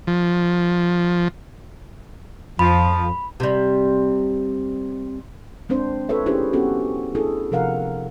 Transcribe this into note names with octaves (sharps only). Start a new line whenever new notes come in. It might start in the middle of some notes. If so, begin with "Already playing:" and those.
F3
F2 F3 B5
C3 G3
G#3 C4 D4 C5
F4 A4 B4 C#5 E5
C#4 D4 E4 G4 G#4 C5
B3 C#4 F#4 G4 A4
D4 E4 G#4 A4
C3 F3 A#4 F5 F#5